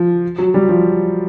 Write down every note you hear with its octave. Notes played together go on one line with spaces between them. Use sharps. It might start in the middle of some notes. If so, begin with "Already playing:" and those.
Already playing: F3
F#3
G3
F3